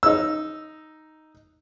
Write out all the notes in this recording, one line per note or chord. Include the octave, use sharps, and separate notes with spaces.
D#4 E6